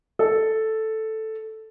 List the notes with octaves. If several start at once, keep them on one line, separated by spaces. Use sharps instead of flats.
A4